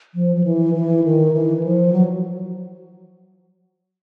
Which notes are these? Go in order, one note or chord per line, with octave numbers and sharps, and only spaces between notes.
F3
F3
E3
E3
D#3
E3
F3
F#3